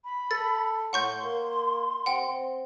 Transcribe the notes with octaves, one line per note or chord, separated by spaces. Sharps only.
B5
A4 A6
A2 F#5 C6 C#6 G6
A#3
C3 F#5 G5
C4